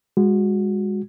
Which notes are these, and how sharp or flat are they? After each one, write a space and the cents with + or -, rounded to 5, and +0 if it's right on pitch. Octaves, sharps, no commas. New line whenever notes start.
G#3 -30 F#4 -20